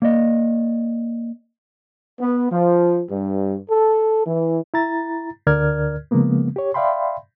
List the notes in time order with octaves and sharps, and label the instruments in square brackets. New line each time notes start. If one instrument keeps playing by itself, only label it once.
[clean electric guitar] A#3 D5 D#5
[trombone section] B3
F3
G2
A4
E3
[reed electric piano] E4 A#5 A6
D2 D3 A#4 D5 F6 G#6
C#3 F3 G#3 A#3 B3
G4 C#5
D5 E5 F5 G5 B5 C6